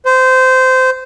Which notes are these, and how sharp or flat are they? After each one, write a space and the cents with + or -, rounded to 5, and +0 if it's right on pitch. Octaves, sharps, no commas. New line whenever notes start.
C5 -20